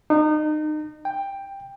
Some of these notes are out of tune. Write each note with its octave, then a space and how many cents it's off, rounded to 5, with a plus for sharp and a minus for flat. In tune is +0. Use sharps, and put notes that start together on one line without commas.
D#4 -30
G5 +10